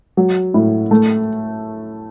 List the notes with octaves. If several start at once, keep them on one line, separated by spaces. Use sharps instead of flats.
F#3
A2
A3